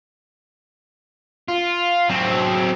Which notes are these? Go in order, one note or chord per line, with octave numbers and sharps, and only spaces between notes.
F4
F#3 C4